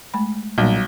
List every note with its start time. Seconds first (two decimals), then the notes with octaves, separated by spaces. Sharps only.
0.14 G#3 A3 B5
0.58 B1 A#2 G3